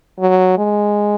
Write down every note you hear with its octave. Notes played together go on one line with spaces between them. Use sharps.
F#3
G#3